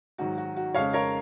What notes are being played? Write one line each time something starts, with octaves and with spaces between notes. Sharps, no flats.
G#2 D#3 F#3 F#4
F#4
F#4
F2 C#3 G#3 C#5 F5
A#4 C#5